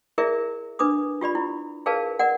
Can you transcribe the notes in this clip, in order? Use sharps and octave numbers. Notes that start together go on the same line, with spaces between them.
E4 G#4 A#4 D5 E5
D4 B4 D6 D#6
F4 G4 D5 B5
E4
G#4 A#4 B4 D5 F5 A5
A#4 D5 F#5